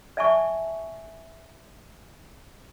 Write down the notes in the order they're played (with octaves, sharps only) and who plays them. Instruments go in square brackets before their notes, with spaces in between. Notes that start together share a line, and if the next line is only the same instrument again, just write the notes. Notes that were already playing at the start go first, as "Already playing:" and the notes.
[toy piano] D5 E5 G#5 A5 C#6